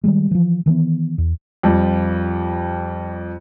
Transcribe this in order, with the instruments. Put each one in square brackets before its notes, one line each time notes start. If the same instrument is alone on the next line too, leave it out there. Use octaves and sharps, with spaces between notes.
[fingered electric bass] D#3 G3 G#3
E3 F3
D#3 E3 G#3 B3
E2
[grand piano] F2 F3 G3